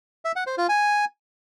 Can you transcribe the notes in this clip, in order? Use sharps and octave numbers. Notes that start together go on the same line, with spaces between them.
E5
F#5
C5
F4
G#5